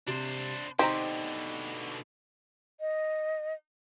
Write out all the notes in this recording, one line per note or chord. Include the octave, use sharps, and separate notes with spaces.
C3 D4 C5
B2 D3 C4 D#4 G4 C5 A#5
D#5